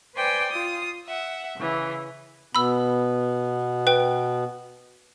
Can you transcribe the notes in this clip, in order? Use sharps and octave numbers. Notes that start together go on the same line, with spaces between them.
B4 C5 D5 G5 G#5
F4 D#6
E5 F#5
C#3 E3
B2 B3 B5 E6
B4 G5